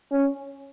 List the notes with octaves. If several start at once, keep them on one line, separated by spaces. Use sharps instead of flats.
C#4